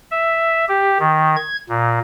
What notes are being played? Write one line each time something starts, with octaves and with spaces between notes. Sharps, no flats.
E5
G4
D#3
G#6
A#2